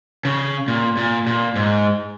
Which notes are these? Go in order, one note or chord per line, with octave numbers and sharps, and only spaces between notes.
C#3
A#2
A#2
A#2
G#2